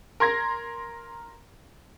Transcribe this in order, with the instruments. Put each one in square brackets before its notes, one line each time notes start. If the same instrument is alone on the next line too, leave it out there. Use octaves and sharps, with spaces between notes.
[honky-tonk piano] A#4 C6 G#6 A#6